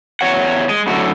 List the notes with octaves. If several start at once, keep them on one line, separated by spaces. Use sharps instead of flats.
E2 C#5 F#5
G#3
F#2 A2 D3 F#4